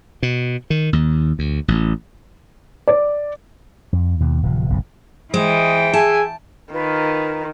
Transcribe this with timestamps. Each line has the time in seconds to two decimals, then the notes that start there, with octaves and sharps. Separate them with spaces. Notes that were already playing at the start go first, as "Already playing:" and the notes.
0.23 B2
0.70 D#3
0.93 D#2
1.39 D2
1.68 A1
2.88 D5
3.93 F2
4.20 D#2 B2
4.43 D1 C3 F3
4.70 F#1 B1 A2 D3
5.34 E3 G3 G#3 C5 D#5 G5 D#6
5.94 G#4 E5 G#5 A5
6.73 D#3 F4 A#4 B4